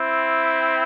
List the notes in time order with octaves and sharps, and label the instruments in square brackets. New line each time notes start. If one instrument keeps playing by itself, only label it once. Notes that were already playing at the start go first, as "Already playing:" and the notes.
Already playing: [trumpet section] C4 E4